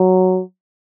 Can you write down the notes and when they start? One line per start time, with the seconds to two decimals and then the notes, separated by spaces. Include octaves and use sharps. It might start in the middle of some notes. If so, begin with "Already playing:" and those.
Already playing: F#3